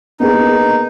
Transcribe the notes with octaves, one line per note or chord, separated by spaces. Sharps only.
A#3 B3 D#4 G#4